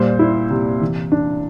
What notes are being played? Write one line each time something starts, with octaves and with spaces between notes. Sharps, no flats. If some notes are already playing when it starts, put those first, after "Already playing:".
Already playing: A#2 G3 C5
E4
C3
E3
D4